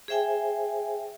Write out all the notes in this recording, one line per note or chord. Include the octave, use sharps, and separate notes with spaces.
G#4 C5 E5 G5 G#5